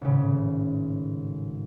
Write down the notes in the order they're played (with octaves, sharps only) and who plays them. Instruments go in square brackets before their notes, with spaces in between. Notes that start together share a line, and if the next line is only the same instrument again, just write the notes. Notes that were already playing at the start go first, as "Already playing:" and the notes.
[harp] G#1 A2 C#3